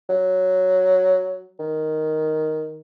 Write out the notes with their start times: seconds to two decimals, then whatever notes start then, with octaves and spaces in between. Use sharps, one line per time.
0.09 F#3
1.59 D#3